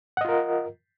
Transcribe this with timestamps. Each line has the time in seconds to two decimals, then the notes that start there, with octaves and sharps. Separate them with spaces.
0.17 F#5
0.21 D#5
0.25 F4
0.29 A#4